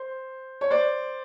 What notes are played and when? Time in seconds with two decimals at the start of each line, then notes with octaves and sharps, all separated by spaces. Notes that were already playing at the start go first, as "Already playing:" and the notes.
Already playing: C5
0.61 C#5
0.71 C5 D5